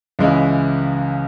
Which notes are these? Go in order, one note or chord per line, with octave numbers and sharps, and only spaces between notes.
C#2 C#3 E3 G#3 E4